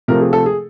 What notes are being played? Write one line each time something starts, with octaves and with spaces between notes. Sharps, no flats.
C3 F3 A3 A#4
G#4
A4
G#4